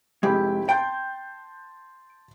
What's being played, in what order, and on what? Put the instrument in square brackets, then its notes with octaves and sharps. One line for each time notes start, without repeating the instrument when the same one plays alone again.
[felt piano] F1 E4 G4 [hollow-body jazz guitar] G#3
[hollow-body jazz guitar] G5 [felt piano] A5 C6 G6